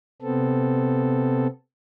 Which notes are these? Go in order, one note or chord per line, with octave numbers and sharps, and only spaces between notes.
C3 B3 C4 A4